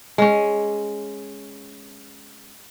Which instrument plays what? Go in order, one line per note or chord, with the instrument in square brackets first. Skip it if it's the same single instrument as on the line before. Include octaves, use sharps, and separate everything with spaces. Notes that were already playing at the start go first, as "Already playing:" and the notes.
[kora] G#3 C#4